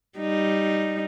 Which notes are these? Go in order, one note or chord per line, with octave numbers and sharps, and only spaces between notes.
G3 D#4